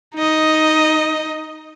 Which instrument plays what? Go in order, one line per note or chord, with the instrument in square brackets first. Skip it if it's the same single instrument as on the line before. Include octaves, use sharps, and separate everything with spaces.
[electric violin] D#4 D#5